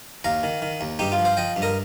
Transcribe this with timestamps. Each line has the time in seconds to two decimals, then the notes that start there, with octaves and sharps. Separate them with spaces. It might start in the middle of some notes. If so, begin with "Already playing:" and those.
0.24 D#2 F5 A#5
0.43 D#3
0.62 D#3
0.81 D#2
0.99 G2 D#4 G4
1.12 F4
1.18 F3
1.25 C5 F5
1.37 F3 D#5 G5
1.56 G2
1.62 A#4 D#5